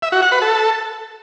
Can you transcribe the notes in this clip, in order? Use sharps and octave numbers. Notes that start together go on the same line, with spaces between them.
E5
F#4
F#5
B4
A4